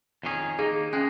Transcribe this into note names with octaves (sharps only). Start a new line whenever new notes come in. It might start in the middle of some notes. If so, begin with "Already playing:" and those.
F2 D#3 C#4 G#4
D#3 A#3 D#4 G#4
F3 G#3 C#4